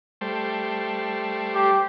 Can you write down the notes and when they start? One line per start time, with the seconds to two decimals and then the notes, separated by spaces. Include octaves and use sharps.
0.21 G3 A3 C5
1.55 G4